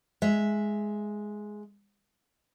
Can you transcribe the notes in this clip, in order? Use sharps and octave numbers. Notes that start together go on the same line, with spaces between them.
G#3 E5